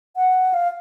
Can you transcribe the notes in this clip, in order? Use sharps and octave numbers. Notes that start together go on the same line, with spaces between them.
F#5
F5